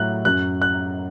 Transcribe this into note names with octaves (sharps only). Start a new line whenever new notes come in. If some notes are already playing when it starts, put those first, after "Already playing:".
Already playing: A2 F#3 F#6
F#2 F#3 F#6
F#6